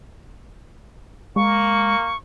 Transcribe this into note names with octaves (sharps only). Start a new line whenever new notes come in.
G#3 A#3 C#6